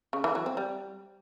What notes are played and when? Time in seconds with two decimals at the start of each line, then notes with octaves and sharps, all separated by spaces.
0.13 C#3
0.24 E3
0.35 F#3
0.46 C4
0.57 G3